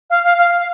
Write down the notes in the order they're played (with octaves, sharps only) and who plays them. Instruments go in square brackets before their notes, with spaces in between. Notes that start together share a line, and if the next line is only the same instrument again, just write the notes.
[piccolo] F5
F5
F5
F5